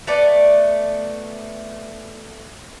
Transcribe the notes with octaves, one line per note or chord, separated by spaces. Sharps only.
A3 B3 D5